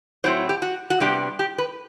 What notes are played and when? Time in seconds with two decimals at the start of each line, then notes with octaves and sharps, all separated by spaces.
0.24 A2 F#3 C4 E4 C5
0.49 G4
0.62 F#4
0.90 F#4
1.00 C3 G3 B3 D4 G4
1.39 G4
1.58 B4